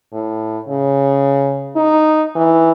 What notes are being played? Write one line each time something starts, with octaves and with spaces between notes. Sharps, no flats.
A2
C#3
D#4
E3